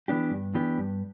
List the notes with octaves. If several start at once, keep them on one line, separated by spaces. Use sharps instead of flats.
E3 B3 D4 G4
G2
E3 B3 D4 G4
G2